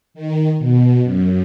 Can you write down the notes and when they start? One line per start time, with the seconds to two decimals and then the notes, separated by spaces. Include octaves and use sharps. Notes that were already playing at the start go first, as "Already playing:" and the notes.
0.14 D#3
0.59 B2
1.04 F#2